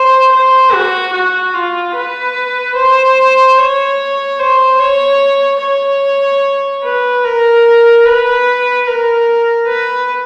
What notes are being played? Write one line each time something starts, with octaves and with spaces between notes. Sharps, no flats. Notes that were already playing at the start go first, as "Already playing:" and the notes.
Already playing: C5
C5
F#4
F#4
F4
B4
C5
C#5
C5
C#5
C#5
B4
A#4
B4
A#4
B4